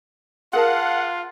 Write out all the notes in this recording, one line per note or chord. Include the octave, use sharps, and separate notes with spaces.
F4 G#4 A#4 F5 F#5 A5